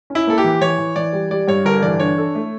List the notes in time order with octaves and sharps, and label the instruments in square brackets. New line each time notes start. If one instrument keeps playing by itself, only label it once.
[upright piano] C#4
[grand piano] E4
[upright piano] A#3 [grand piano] A4
[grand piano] G4
[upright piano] E3
[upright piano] E3 [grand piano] C#5
[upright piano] E3
[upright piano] E3 [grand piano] D5
[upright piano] G3
[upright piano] G3 [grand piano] D5
[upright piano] G2 [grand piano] C#5
[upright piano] G1 [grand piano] A#4
[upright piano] E3 [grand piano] D5
[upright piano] D4 [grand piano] C#5
[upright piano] A4
A3